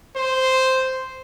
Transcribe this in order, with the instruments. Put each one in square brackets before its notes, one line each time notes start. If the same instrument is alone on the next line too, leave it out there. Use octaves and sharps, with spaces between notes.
[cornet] C5